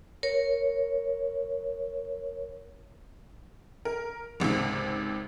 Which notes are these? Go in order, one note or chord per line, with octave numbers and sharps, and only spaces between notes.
A#4 C#5
A#4
G#1 C#2 G#2 C3